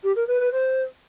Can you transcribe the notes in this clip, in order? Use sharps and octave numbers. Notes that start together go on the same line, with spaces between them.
G4
A#4
B4
B4
C5